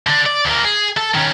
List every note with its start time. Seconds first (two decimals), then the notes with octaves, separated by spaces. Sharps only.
0.07 D3 D4
0.26 D5
0.45 D2 A#3
0.65 G#4
0.97 A4
1.15 D#3 C#4